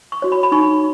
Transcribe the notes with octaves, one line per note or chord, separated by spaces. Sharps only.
C#6
F#4 C#5
B5
B5
D#4 C#6